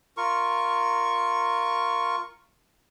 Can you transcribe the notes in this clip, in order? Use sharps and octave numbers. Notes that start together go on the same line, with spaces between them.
F4 A#4 C#6